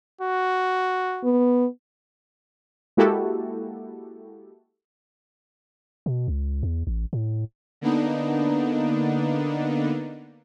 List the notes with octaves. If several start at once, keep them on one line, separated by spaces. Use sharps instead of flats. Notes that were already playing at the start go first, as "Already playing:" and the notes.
F#4
B3
G#3 A#3 E4 F#4 G4 A4
B2
C#2
E2
A1
A2
D3 A#3 B3 D4 D#4